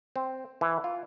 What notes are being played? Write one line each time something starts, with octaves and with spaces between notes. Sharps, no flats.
C4
E3
F4